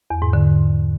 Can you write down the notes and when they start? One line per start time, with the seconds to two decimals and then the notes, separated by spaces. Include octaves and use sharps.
0.10 E2
0.22 G#2
0.33 D3